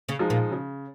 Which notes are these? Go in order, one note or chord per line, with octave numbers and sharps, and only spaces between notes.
C#3 C#4
F3 G#3 D#4
A#2 A#3
C#3